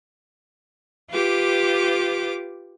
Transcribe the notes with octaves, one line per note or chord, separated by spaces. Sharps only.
F4 G4 B4 D6